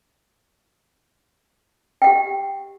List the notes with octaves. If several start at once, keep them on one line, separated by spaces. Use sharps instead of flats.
G4 F#5 G5